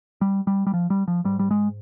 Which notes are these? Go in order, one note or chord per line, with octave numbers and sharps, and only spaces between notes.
G3
G3
G3
F3
G3
F3
G#2 G3
G3
G#3